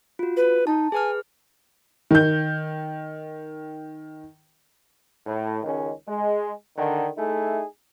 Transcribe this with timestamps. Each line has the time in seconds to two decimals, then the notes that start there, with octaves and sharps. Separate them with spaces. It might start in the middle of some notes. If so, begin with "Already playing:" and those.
0.19 F4 F#4
0.37 B4
0.67 D#4 A5
0.92 G#4 B4 G#5 F6
2.11 D#3 G6
5.26 A2
5.63 C#2 D#3 G#3 C#4
6.06 G#3
6.76 D3 D#3
7.16 A3 D#4 E4 G#4